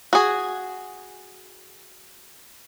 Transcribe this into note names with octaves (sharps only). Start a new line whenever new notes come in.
F#4 G#4